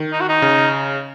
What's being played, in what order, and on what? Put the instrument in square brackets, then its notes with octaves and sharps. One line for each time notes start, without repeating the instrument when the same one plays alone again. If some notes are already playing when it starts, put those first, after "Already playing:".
Already playing: [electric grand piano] D#3
[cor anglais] D#4
F#4
D#4
[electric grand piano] C#3